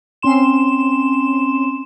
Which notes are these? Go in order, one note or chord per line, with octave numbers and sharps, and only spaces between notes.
C4 C#4 C6 E7